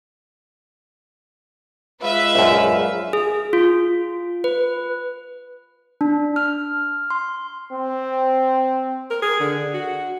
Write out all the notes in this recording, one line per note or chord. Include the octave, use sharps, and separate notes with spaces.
G#3 F4 B4 E5 F5
A#1 F#2
G#4
F4
B4
D4
F6
C6
C4
A#4
G#4
D3
F#4